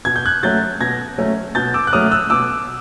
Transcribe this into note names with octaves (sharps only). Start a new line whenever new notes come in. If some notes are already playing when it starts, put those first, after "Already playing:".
B2 G#6
G6
F#6 G#6
F#3 A3 C#4 G6 A6
B2 G#6 A#6
F#3 A3 C#4
B2 G6 A6
D6 E6
F#6
F#3 A3 C#4 D#6 F6
E6 F#6
B2 D6 E6